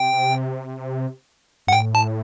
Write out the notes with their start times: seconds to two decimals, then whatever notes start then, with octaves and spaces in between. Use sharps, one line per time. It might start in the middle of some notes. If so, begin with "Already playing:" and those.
Already playing: C3 G5
1.67 G2 F#5
1.73 A2 G5
1.95 A5